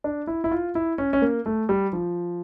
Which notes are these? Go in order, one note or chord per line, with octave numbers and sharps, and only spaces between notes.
D4
E4
E4
F4
E4
C#4
C#4
A#3
A3
G3
F3